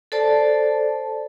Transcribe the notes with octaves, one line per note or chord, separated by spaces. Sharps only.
A4 C5 D5 A5